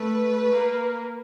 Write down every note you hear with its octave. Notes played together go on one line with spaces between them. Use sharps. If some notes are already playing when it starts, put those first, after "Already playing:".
Already playing: A3 B4
A#3